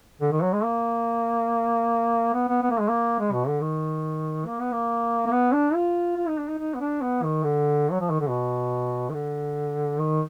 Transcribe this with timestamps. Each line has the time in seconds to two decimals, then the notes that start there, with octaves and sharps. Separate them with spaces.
0.21 D3
0.31 D#3
0.43 F#3
0.53 G#3
0.64 A#3
2.34 B3
2.48 B3
2.62 B3
2.71 A#3
2.80 G#3
2.89 A#3
3.19 G#3
3.32 B2
3.48 D3
3.61 D#3
4.46 A#3
4.60 B3
4.72 A#3
5.26 A#3
5.32 B3
5.53 D4
5.74 F4
6.17 F4
6.28 D#4
6.38 D4
6.48 D#4
6.58 D#4
6.75 B3
6.80 D4
7.02 B3
7.23 D#3
7.44 D3
7.91 F#3
8.01 F3
8.10 D#3
8.21 D3
8.29 B2
9.10 D#3
9.14 D3
9.99 D#3